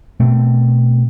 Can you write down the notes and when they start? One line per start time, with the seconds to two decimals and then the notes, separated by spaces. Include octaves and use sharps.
0.20 B2 A3 C4